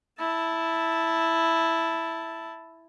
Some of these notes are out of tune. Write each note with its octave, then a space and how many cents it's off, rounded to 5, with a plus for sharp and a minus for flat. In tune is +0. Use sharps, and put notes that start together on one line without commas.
E4 +0 A5 +0